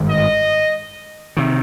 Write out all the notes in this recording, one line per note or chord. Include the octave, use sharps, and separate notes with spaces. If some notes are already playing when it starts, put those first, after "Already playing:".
Already playing: G#1 G2 D#3 G#3
D#5
C3 D#3